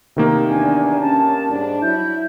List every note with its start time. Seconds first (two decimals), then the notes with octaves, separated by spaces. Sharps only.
0.16 C3 D#3 A#3
0.49 E2 D4 G#5
1.01 C#4 A5
1.49 G#2 G3 D4
1.82 F#3 E4 G6